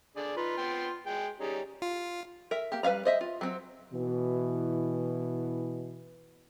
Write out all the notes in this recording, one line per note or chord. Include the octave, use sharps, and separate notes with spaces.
D3 G#4 D5
D#4 F4 B4
B3 G5 C6
G#3 G5
G3 C#4 D#4 G#4
F4
A#4 E5
A#3 G4
G3 B4 E5 F5 A#5
C5 D#5 E5
F4
F#3 C4
B2 E3